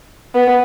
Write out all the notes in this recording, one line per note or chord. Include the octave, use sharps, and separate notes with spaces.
B3